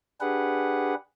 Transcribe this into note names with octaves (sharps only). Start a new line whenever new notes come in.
D4 G4 G#4 B4 F#5